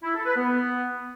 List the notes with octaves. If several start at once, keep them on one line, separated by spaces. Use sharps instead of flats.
E4
A4
B4
B3